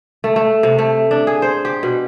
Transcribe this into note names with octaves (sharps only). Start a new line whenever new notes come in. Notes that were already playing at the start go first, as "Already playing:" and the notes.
A3
A3
C3
A3
D4
G#4
C5
G4
B2